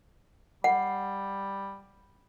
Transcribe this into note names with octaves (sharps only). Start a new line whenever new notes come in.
G3 F#5